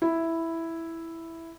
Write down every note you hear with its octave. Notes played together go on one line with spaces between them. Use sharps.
E4